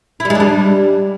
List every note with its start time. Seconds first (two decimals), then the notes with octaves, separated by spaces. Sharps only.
0.20 E4
0.25 G3
0.30 G#3
0.35 D4
0.40 G3